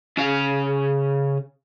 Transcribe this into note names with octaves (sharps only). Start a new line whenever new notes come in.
C#3 F5